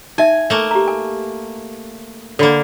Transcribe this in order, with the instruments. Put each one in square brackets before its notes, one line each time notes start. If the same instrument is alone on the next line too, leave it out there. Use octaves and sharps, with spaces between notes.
[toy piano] D#4 E5 [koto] G#5
[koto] A3 A#3
[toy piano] G4 A#5
G#5
[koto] D3 A#3 [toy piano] A4 B5